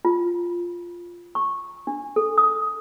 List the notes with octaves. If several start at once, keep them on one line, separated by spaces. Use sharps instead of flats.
F4
C#6
D4
A4
D#6